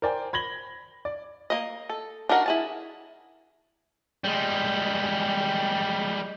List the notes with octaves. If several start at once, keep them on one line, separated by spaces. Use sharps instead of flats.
A#4 C5 D5 G5 G#5
B5 G#6 A#6 F#7 G7
D5
A#3 D#5
A4
D4 D#4 F#4 A#4 F#5
E4 G#4 A5
G3 G#3